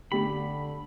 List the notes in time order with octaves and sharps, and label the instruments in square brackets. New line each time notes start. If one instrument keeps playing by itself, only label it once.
[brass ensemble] D3 [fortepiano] A3 G4 [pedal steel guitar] B5